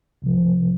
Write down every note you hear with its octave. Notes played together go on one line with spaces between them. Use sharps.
C2 C3 F3